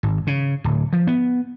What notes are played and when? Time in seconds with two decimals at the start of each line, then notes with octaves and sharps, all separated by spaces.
0.03 G#1
0.27 C#3
0.64 D1
0.93 F3
1.07 B3